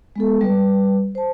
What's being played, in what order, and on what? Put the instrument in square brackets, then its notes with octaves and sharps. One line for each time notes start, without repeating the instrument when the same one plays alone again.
[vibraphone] G#3 B3 A4
G3 B4
C5 A5